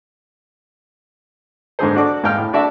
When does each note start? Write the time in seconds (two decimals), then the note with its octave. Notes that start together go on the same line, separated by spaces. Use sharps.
1.79 G#2 D3 G#4 C5
1.95 D4 F#4 A4 D5 D6
2.23 G#2 F5 G5 F6
2.37 A2
2.53 D4 F#4 D5 E5 A5